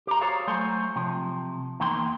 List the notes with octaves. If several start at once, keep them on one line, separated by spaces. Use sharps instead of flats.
G4 A#5
F#4 G#4 A4 C5 C#5 F5
F#3 A3 C5 C#5 G#5 C6
C3 F3
E2 D#3 A#3 G5 C6